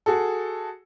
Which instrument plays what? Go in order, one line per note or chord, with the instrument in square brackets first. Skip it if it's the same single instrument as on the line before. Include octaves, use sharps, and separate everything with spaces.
[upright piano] F#4 G#4 A4